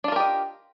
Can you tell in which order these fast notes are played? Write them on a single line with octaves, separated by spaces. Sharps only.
D4 F4 A#4 G4 D#5